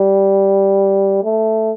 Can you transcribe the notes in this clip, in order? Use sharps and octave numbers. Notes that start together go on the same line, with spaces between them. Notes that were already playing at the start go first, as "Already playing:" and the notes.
Already playing: G3
A3